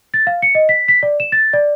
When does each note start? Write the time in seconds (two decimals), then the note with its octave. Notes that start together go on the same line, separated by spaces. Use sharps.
0.14 A6
0.27 F5
0.42 C#7
0.55 D#5
0.69 B6
0.88 B6
1.03 D5
1.20 E7
1.32 A6
1.53 D5